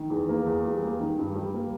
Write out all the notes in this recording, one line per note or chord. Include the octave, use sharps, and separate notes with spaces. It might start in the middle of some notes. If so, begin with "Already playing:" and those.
Already playing: D#3
E2
A#3
E2
G3
A#3
D#3
G2
G3
A#3